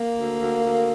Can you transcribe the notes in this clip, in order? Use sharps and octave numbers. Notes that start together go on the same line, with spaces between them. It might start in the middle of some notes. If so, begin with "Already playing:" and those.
Already playing: A#3
D2
D2
D2